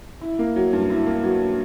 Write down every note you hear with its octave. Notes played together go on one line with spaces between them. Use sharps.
E4
A#3
F#3
G2
E4
A#3
F#3